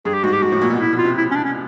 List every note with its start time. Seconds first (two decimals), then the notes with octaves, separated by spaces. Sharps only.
0.05 G2 G#4
0.14 G4
0.24 G#2 F#4
0.33 G4
0.42 G#2 F#4
0.52 A2
0.61 A#2
0.70 B2
0.80 A#2 E4
0.93 B2
0.98 F4
1.05 C3
1.17 E4
1.31 C#4
1.36 D4
1.45 C#4